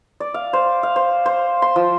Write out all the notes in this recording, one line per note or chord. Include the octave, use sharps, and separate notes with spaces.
D5
F5
C5
F5
C5
C5
C6
F3